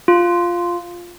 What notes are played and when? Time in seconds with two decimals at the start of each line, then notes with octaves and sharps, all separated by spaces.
0.08 F4